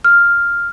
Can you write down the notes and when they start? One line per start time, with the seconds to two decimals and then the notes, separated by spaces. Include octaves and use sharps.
0.04 F6